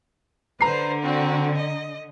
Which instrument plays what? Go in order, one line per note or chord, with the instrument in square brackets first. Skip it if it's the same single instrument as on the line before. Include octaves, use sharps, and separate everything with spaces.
[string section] D3 [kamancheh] B4 C5 [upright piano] A#5 C7
[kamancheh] C4 F#4
D#5